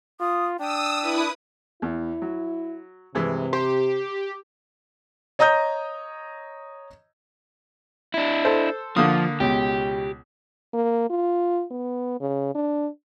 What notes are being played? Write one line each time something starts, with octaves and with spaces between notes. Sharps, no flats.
F4 D#6
D4 G5 D#6 E6
E4 B4 D#6
E2 E4
F#3
G2 C3 E3 G#3
G4 C5
C#5 D#5 A#5 D#6 G6
D4 E4
A4 C5
D3 F3 A#3 D#6
C#2 B2 G4
A#3
F4
B3
C#3
D4